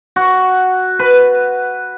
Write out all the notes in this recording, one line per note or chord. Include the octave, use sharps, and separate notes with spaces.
F#4
B4